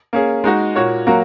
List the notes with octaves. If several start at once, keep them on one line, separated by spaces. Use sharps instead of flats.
A#3 C#4 G#4
G#3 D#4 F#4
A#2 A#3 F#4 C#5
F#3 A#3 F#4 A#4